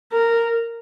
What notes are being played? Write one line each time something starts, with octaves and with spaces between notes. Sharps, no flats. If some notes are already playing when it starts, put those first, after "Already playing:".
A#4